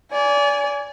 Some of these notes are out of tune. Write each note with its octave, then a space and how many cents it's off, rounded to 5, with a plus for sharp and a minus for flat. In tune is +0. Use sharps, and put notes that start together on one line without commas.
D5 -30 G#5 +0